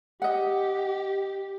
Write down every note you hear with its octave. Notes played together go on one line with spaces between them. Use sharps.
G4 D#5 F#5